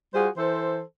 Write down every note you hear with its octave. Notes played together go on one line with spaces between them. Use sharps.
G3 F4 F#4 G#4 C5
E3 A4 C5